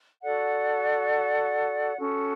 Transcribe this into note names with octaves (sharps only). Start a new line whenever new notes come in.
F#4 A4 D5 F#5
C#4 F#4 A4